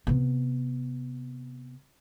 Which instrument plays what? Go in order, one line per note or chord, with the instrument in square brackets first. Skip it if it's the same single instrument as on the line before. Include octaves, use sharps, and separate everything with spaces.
[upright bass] C3 B3